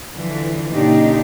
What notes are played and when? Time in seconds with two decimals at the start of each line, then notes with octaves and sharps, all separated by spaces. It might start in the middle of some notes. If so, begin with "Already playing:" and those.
0.12 D3 E3 F3
0.71 A#2 C#3 D4 D#4 G4